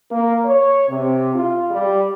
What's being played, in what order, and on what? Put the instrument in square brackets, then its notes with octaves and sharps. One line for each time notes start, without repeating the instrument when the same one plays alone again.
[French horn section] A#3
C#5
C3
F4
G3